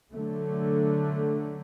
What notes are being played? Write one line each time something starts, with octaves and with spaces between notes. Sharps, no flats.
D3 F#3 A3